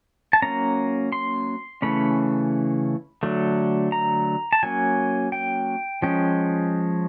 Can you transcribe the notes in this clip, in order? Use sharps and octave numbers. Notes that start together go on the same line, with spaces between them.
A5
F#3 A#3 C#4 A#5
C6
C#3 E3 A3 C#4 B5
D3 F#3 A3
A#5
A5
F#3 A#3 C#4 G#5
G5
F3 G#3 C#4 G5